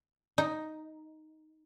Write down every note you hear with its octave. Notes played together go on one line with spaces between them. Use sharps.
D#4